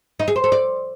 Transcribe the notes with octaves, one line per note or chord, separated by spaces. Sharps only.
D#4
G#4
C5
A4
D5